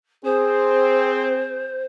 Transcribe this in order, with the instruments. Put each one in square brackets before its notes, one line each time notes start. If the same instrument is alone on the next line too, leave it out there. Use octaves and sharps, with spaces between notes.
[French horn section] C4 [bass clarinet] G#4 [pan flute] C5